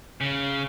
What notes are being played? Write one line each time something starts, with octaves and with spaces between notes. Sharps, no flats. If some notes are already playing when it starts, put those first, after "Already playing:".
C#3